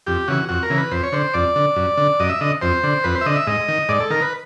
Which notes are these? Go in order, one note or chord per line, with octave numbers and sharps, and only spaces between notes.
F2 G4
C#3 E3 F#4
F2 F#4
A#4
C#3 E3
B4
F2 C5
C#5
D3 C5
F2 D5
D3
F#2
D3
F#2 D#5
E5
D3 D#5
F2 C5
D3
F2 B4
C5
E5
D3 D#5
E5
G#2 D#5
D#3
G#2 D5
A4
D#3 A#4
B4